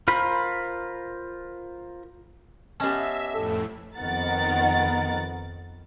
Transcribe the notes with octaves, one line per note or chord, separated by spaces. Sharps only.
F4 A#4 C5 B5
B3 C#4 G4 D#5 E5 A5
F2 A2 A4
F2 D#3 B3 A#4 F#5 A6